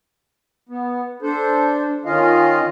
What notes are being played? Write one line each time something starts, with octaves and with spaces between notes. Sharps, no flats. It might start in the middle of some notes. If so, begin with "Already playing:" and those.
B3
D4 A4 C5
D#3 C#4 F4 D#5 F5